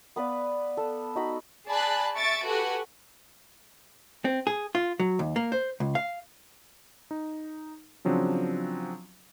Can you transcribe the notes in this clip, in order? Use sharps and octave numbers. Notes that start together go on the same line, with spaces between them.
B3 B4 D5 F5
A4
D#4 F#4 B5
G#4 D5 G#5 A5 B5 F#6
E5 C#6 A6 D7
F#4 G4 A4 B4 F#5 G#5
C4
G#4
F4
F#3
D#2
A#3
C5
C#2
F5
D#4
C#3 F3 F#3 C4 D4